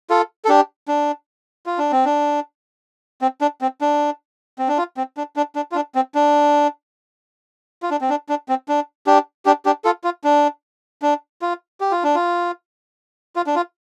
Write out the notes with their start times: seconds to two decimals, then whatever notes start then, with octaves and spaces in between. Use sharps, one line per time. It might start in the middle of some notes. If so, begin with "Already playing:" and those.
0.10 F4 A4
0.45 A4
0.49 D4 G4
0.88 D4
1.66 F4
1.78 D4
1.92 C4
2.05 D4
3.21 C4
3.41 D4
3.61 C4
3.81 D4
4.59 C4
4.68 D4
4.78 F4
4.97 C4
5.17 D4
5.36 D4
5.55 D4
5.72 F4
5.75 D4
5.95 C4
6.15 D4
7.83 F4
7.91 D4
8.01 C4
8.10 D4
8.29 D4
8.49 C4
8.69 D4
9.07 D4 G4
9.46 D4 G4
9.65 D4 G4
9.85 F4 A4
10.04 F4
10.24 D4
11.02 D4
11.42 F4
11.81 G4
11.92 F4
12.04 D4
12.15 F4
13.36 F4
13.47 D4
13.56 F4